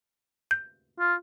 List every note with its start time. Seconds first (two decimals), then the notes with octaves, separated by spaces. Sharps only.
0.51 G6
0.99 F4